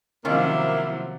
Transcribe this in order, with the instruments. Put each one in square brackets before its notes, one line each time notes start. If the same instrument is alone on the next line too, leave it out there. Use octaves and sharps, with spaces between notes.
[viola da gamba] C3 F3 F#3 [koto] D#3 C#4 F4 [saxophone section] A#3 E4